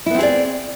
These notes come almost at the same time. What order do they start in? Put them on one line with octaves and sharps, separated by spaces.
E4 B3 C4 G#4 D5